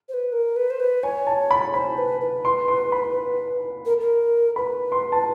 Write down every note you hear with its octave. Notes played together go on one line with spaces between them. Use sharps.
C5
B4
A#4
B4
C5
B4
C#5 G#5
A5
B5
C5 B5
B4
B4
C6
C6
B5
A#4
A#4
B4 B5
C6
A5